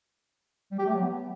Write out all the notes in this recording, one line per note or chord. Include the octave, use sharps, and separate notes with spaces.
G3
G4
A3
F#3
B3